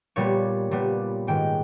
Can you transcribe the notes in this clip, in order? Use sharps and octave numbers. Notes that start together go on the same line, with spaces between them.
A#2 G3 B3 C#5
A#2 G3 B3
G#2 D#3 G#3 B3 G5